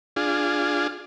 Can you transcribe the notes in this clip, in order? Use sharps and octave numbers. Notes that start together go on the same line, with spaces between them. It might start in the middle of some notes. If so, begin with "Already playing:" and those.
D4 F4 G#4